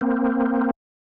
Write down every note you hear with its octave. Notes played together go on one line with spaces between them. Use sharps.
A#3 C4